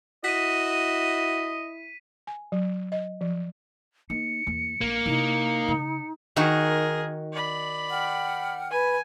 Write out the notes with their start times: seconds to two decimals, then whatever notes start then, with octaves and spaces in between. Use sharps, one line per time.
0.24 E4 F#4 D#5 B6 D#7
2.27 G#5
2.52 F#3
2.92 D#5
3.21 F3
4.10 A#3 D#4 C#7
4.47 E2 A#3
4.81 A#1 A#3
5.06 C3 D#4 E4
5.68 C#3
6.36 D#3 D#4 F#4 G#4 A#4
7.33 D5 B5
7.90 F#5 G5 F6
8.71 B4 G#5